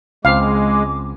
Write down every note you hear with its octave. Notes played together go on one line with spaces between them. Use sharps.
C#2 G#3 C4 F5 D6